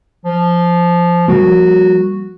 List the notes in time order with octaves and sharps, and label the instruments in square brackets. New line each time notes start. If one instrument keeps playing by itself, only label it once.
[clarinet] F3
[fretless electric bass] F3 G3 A#3 [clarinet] F#4